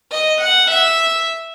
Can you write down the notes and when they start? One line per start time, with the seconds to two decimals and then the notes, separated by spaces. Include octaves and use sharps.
0.12 D#5
0.41 F#5
0.70 E5